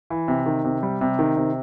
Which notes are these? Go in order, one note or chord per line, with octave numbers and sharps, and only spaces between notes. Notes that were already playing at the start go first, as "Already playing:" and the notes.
E3
C3
D#3
C3
G3
C3
D#3
C3